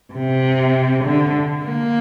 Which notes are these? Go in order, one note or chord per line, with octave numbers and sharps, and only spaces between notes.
C3
D3
A#3